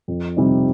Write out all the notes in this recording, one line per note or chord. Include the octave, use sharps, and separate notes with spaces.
F2
C3 G3 C4 D#4